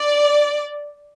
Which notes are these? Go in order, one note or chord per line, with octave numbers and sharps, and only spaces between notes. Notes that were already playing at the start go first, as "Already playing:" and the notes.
Already playing: D5